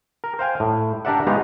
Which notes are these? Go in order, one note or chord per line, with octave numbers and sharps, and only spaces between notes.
A#4
C5 F5 G5 G#5
A2
D4 G4 A#4 D5 E5 F#5
G#3 B3 D#4 F#4 G4 F5